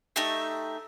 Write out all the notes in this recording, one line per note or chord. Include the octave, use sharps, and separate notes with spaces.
A3 D#4 G4 E5